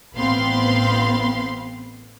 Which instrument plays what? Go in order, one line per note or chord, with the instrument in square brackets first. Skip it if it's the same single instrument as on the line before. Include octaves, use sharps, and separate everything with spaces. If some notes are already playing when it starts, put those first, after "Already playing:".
[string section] A1 B3 C4 F5 B5 C6